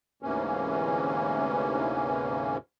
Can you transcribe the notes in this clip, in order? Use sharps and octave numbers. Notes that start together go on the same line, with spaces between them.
D2 G#2 C3 E3 A#3 C#4